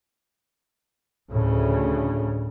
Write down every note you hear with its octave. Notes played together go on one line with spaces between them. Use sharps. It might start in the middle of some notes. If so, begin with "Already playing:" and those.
D2 A2 C#3